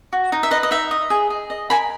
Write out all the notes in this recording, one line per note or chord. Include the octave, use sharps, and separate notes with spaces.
F#4
D#4
E5
B4 D#5
D#5
D#4 E5
D#5
G#4
G#4
D#5
A#4 G#5 B5